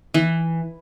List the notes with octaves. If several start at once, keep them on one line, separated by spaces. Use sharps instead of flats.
E3